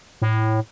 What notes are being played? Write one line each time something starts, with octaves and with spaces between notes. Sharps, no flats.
A2